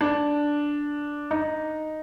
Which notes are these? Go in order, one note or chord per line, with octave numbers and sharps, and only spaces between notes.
D4
D#4